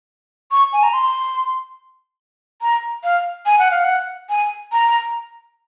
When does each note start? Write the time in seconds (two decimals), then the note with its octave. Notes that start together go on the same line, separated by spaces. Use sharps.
0.51 C#6
0.73 G#5
0.83 A#5
0.93 C6
2.62 A#5
3.04 F5
3.46 G#5
3.59 F#5
3.71 F5
3.84 F#5
4.30 G#5
4.72 A#5